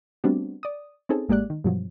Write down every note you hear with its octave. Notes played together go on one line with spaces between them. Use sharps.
G3 A3 B3 C4 D4 F#4
D5 D#6
C4 C#4 D#4 G#4 A4
A1 G#3 A#3 G4 D5 F#6
D#3
G2 B2 F3 F#3